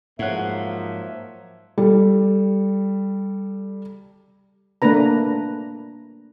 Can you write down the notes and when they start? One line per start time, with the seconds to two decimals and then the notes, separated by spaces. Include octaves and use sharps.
0.19 G#2 F3 F#3 A#3 C#5 E5 F#5 F#6
1.78 G3 A4
4.82 A3 A#3 D4 B4 A#5